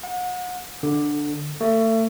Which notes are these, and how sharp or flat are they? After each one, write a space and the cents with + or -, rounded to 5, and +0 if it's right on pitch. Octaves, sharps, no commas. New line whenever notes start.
F#5 -35
D3 +5
A3 +30